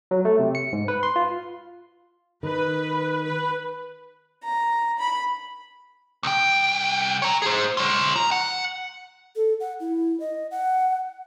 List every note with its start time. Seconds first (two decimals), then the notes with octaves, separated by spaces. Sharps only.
0.11 F#3
0.25 A3
0.39 C3
0.55 C#7
0.73 G#2
0.88 B4
1.03 C6
1.16 F4
2.43 D#3 B4
3.24 B4
4.44 A#5
4.99 B5
6.23 C2 G5
7.22 C#5 A#5
7.42 G#4 C5
7.77 F4 C#5
8.16 A#5
8.31 F#5
9.36 A4
9.60 F#5
9.80 E4
10.20 D#5
10.51 F#5